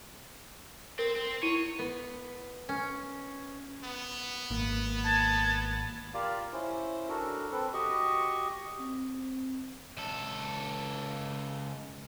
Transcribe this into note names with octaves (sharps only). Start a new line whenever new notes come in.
C4 A#4
C4
E4 C#5 D#7
B3
C#4
B3
G#1 A#3
A5 G#6
F4 G4 A#4 D5 F5
C#4 E4 C5
D4 F#4 A4 A#4
C4 A4 B4
F#4 G4 D#5 C#6
C4
C#2 A4